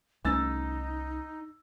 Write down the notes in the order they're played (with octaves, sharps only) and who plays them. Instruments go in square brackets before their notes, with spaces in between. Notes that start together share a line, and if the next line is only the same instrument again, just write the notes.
[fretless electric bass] C2 A3 C#4 [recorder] D#4 [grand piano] E6 A6